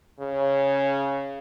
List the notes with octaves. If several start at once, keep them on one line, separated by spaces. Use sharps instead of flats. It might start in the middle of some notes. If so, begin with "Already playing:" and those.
C#3